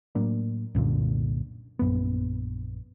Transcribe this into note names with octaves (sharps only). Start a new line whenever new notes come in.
A2 F#3 A#3 D4
C2 F#2 A#2 D3
A#1 F#2 B3